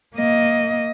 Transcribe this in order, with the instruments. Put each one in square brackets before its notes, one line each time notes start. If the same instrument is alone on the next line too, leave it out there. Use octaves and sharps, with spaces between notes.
[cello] A#3 D#5